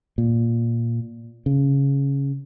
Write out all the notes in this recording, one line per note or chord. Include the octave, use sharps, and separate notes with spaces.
A#2
C#3